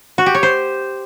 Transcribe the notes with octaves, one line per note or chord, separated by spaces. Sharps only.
F#4
G4
C#5
C5